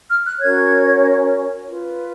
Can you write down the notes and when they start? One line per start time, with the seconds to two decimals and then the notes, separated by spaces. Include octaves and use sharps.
0.09 F6
0.25 F#6
0.40 C#4 F#4 A#4 C#5 G#6
1.67 F4 B4